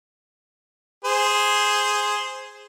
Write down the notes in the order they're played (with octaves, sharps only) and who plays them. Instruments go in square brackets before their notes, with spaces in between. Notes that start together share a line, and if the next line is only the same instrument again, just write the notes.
[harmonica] G#4 C5